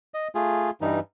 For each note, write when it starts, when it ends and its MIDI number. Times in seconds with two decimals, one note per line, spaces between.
0.14 0.28 75
0.35 0.70 57
0.35 0.70 65
0.35 0.70 68
0.81 1.00 43
0.81 1.00 52
0.81 1.00 55
0.81 1.00 63